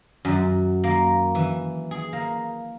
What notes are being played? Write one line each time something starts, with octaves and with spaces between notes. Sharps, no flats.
F#2
A#3
E3
G#4
A#3